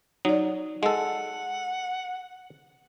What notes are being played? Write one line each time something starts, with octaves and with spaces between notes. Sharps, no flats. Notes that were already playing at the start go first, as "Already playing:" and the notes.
F#3 D#4 D5
G#3 A4 F#5